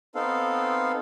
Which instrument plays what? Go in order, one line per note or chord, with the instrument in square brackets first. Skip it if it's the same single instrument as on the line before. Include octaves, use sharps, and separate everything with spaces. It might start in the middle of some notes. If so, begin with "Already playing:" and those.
[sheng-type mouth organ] B3 C4 D#4 A4 F5